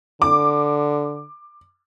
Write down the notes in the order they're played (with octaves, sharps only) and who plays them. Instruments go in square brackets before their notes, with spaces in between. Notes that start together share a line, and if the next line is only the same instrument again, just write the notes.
[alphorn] D3 [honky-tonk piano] D6